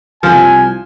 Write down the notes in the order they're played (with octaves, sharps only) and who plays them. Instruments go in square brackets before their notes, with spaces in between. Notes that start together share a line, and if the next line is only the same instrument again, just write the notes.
[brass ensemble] C2 G#5 [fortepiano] F3